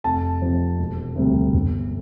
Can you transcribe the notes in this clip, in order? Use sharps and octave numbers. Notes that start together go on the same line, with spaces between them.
F1 A5
F2 C3
E1
D2 C3 G3
G1